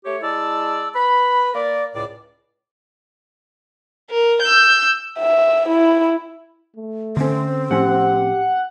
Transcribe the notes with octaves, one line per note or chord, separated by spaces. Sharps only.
A3 G4 C#5
G#3 E4 D5 A5 E6
B4 B5
A#3 A#4 D5
C#2 A2 D5
A#4
E6 G6
E5
E4
A3
D3 C4 C#4
A2 F3 C#4 G4 F#5